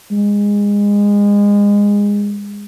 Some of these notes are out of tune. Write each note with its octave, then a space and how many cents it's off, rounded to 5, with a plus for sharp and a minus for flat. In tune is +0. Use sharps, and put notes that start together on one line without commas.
G#3 -25